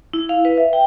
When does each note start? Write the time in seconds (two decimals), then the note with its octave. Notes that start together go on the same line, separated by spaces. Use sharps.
0.13 E4
0.29 F5
0.45 B4
0.57 E5
0.73 G5